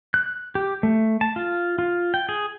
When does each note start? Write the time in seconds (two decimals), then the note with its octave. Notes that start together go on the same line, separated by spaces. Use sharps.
0.14 F#6
0.55 G4
0.83 A3
1.21 A5
1.36 F4
1.79 F4
2.14 G5
2.29 G#4